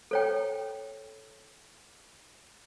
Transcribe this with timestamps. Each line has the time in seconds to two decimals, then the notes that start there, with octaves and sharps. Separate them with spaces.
0.11 A4 C#5 G5